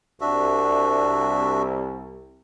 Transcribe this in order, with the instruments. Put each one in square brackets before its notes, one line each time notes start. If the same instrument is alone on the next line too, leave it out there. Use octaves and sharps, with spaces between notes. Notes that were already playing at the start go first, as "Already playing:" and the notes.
[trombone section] C2 [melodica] D4 F#4 E5